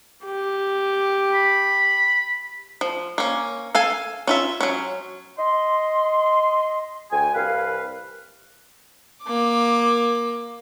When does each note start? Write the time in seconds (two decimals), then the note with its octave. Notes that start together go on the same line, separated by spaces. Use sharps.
0.25 G4
1.34 B5
2.81 F3
3.18 A#3 C#4
3.75 A4 F5 G#5
4.27 C#4 F4 E5
4.61 F#3 C#4
5.38 D#5 C6
7.12 D2 G5 G#5
7.35 C2 A#4 B4 F5
9.24 A#3 D6